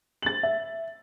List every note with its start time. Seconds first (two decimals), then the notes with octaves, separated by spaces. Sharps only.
0.22 A6 F#7
0.43 E5